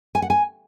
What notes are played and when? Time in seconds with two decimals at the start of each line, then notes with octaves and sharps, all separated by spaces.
0.15 G#5
0.22 F#5
0.30 G#5